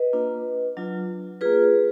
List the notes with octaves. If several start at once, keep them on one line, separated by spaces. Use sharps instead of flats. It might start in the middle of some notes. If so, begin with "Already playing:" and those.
Already playing: B4 D#5
A#3 D4 F4
F#3 D4 F4
A#3 F4 G#4 B4